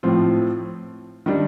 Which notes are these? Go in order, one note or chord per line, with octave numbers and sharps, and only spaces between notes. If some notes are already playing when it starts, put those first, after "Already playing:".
A2 F3 C4 F4
D#3 G3 D4